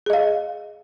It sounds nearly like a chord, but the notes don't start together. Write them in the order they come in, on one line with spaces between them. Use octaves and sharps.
G#4 D#5 F5